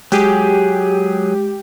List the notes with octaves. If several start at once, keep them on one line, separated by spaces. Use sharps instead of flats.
F#3 G#3 G4 G#4